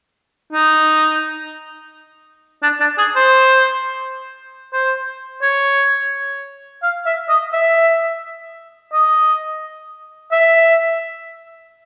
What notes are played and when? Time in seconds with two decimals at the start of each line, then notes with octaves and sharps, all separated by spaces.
0.53 D#4
2.63 D4
2.80 D4
2.98 G#4
3.16 C5
4.73 C5
5.42 C#5
6.83 F5
7.06 E5
7.29 D#5
7.53 E5
8.93 D#5
10.32 E5